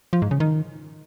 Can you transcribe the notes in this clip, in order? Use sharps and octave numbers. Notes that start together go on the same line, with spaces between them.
F3
G#2
C#3
D#3